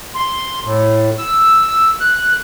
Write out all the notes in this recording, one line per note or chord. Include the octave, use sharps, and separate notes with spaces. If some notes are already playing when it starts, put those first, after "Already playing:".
C6
A2
E6
F#6